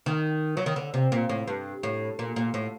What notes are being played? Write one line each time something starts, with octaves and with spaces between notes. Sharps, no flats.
D#3
F#3
D#3
D3
C3
A#2
A2
G2
A2
A#2
A#2
A2